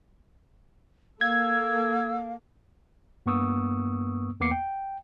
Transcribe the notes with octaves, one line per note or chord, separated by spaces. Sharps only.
A#3 A4 F5 E6 G#6
G2 A#3 B3 C#6 D#6 E6
E2 A#3 B3 D6 C7 C#7
G5